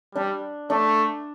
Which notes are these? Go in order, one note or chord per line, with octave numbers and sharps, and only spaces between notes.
G3 D4
A3 D4